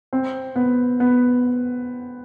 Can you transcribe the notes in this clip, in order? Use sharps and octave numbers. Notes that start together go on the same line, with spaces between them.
C4
B3
B3